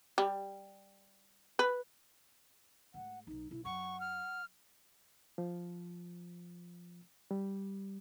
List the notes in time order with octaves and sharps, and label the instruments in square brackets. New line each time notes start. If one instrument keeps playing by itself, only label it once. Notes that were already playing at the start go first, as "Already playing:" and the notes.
[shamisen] G3
B4
[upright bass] G#2 A3 [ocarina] F#5
[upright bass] D1 B1 [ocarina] D#4
[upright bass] B1 [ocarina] E4
[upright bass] F#2 [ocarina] F#5 [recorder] C#6
[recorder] F6
[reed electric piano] F3
G3